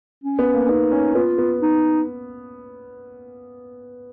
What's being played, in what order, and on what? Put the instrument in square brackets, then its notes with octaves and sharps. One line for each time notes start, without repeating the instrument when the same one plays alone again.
[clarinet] C#4
[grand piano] B3
A#3
[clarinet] C#4
[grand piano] B3 [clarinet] D#4
[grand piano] C#4
[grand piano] B3 [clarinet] F4
[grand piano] B3
[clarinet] D#4